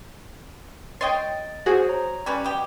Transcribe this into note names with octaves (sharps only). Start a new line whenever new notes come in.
C#5 D#5 G5 C6 A6 D7
F#4 G#4 C5 D#6
C#5 A#5
G3 C#4 B4 G#6
B2 G4